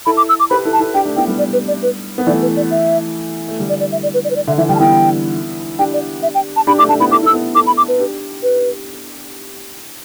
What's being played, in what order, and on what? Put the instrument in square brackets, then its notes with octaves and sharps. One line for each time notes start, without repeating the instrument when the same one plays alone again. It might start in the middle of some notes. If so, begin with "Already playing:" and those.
[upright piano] E4 A4 [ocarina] B5
[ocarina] D6
E6
D6
[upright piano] G4 B4 [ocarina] B5
[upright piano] E4 A4
[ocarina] A5
[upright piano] E4 A4
[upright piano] D4 G4 [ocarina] G5
[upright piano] A3 D4
[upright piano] B3 E4 [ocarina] G5
[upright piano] G3 B3
[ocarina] D5
B4
D5
B4
[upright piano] B3
[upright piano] E3 A3 [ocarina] D5
[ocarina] B4
D5
E5
[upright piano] A3
D3 G3
[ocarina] D5
D5
E5
D5
B4
D5
B4
D5
[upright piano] D3 [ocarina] E5
[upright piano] E3 [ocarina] E5
[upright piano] D3 G3 [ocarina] G5
[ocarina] A5
[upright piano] B3 E4 [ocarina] G5
[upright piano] D4 G4 [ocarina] G5
[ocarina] D5
E5
G5
A5
[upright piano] D4 G4 [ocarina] B5
[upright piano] A3 D4 [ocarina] D6
[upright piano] A3 D4 [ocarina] A5
[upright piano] B3 E4 [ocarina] B5
[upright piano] E4 A4 [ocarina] D6
[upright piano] E4 A4 [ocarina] E6
[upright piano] B3 E4
[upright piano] E4 A4 [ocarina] D6
[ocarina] B5
D6
B4
[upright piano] D4 G4
[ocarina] B4